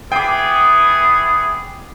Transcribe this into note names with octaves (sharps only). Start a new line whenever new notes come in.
B3 E4 G#4 G5 D6